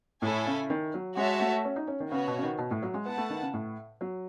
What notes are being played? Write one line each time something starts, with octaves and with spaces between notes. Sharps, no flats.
A2 E4 A4 C#5 G#5
C#3
D#3
F#3
G#3 F#4 C#5 E5 A5
A3
C#4
D#4
C#4
D#3
C#3 B3 F#4 C#5
B2
C#3
D#3
B2
A2
F#3
G#3
B3 E4 B4 F#5 A5
A3
D#3
C#3
A2
F#3